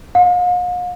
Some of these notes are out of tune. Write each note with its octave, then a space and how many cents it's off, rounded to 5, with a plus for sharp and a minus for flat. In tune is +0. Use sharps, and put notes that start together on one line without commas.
F5 +45